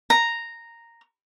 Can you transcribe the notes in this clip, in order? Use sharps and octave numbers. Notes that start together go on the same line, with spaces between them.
A#5